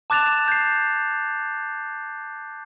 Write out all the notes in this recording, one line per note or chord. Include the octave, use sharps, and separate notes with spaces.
A5 D6 F#6 A6 E7 F7
G6 C7